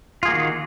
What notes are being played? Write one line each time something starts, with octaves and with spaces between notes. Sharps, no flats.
D#3 A#3 F4 F#4 G#4